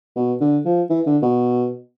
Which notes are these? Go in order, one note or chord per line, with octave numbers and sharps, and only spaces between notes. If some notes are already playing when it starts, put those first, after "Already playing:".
B2
D3
F3
E3
D3
B2